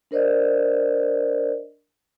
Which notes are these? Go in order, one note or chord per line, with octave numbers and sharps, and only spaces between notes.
D4 A#4 C5 D5 D#5